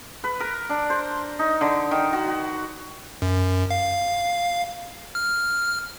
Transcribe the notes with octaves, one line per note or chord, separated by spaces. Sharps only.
B4
A#4
D4
C5
D#4
D3
D#3
F#4
F#4
F#2
F5
F6